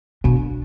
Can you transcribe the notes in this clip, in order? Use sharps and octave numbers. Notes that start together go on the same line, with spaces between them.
B2 D4